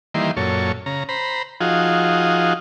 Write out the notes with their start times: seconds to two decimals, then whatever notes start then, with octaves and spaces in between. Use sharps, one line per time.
0.14 D#3 E3 G3 A#3 C6
0.37 F#2 A#2 A4 C#5
0.86 C#3 A#5
1.09 C5 A#5 B5
1.61 F3 D#4 F4 F#4 G#4